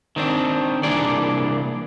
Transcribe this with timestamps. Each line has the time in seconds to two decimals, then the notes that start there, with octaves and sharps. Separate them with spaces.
0.16 D#3 C4 D4
0.83 C2 E3 A#3 D4 G#4 D5